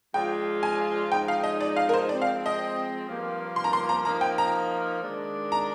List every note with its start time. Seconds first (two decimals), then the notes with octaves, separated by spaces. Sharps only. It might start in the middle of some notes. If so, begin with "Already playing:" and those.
0.14 F3 G#3 D4 F4 G5
0.63 G#5
1.11 F3 G#3 D#4 G5
1.28 F5
1.44 D#5
1.61 D5
1.76 F5
1.89 A#4
1.94 C5
2.09 F3 G#3 C4 D5
2.22 F5
2.46 D#5
3.07 G2 F3 A#3
3.56 C6
3.64 A#5
3.73 C6
3.89 A#5
4.05 F3 A#3 D#4 A#5
4.21 G5
4.38 A#5
5.04 D#3 G#3 D4
5.52 A#5